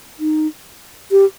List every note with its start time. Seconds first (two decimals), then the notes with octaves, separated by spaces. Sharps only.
0.19 D#4
1.11 G4